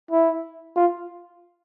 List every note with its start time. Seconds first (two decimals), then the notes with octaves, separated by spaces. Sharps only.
0.11 E4
0.76 F4